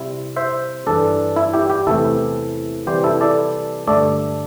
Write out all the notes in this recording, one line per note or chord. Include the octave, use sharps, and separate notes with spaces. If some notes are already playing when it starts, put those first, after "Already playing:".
Already playing: C3 G3 C4 E4
C5 E5
G2 E3 G3 D4 A4 D5
E4
G4
G4
E2 C3 E3 A3 E4 A4
C3 E3 G3 G4 C5
E4 A4
A4 D5
G2 D3 A3 A4 D5